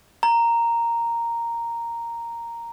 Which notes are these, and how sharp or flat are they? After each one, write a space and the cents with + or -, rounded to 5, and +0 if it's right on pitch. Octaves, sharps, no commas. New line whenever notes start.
A#5 -5